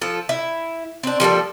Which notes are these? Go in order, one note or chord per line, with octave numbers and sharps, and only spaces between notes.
F3 A4
E4
C4 D4
F3 G3 A#3 A4